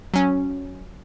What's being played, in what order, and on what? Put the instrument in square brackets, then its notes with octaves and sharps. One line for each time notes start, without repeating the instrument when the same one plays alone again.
[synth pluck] F#3 C#4